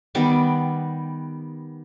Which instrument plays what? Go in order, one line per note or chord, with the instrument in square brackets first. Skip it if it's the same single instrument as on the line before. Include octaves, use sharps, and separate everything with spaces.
[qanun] D#3 G3 B3 D6